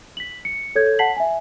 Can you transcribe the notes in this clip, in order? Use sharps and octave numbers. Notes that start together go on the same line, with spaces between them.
B6 F#7
C#7
A4 C#5 G6 G#6
F#5 A5 B6 C7 F#7
E5 G#5